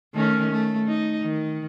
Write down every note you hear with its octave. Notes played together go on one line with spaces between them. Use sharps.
D#3 A3 C#4
A3
D#4
D#3